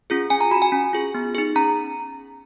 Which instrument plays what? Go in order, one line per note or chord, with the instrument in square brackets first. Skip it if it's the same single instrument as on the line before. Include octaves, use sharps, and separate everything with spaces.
[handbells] C#4 F4 G#4
C#4 G#5
A#5
F#4 B5
G#5
C#4
F4 G#4
B3
D#4 G#4
C#4 A#5